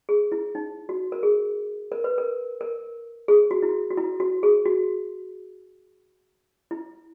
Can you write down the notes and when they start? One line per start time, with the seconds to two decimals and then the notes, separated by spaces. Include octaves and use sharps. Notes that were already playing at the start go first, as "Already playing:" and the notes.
0.09 G#4
0.32 E4
0.55 D#4
0.89 F#4
1.12 A#4
1.23 G#4
1.92 A#4
2.04 B4
2.18 A#4
2.61 A#4
3.28 G#4
3.51 F#4
3.62 E4
3.90 F#4
3.97 E4
4.20 F#4
4.43 G#4
4.65 F#4
6.71 E4